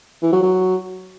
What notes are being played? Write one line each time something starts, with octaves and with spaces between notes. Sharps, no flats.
E3
F#3
F#3